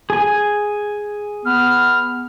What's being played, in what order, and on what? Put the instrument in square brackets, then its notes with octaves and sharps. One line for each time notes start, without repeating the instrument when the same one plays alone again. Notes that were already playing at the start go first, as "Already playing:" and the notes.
[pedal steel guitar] G#4 G#5
[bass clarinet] B3 [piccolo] F6